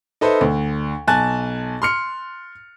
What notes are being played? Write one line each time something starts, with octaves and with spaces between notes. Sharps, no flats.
D#4 A4 B4 C5 E5
D2
B1 G#5 A5 F#6 A6
C6 F6 C#7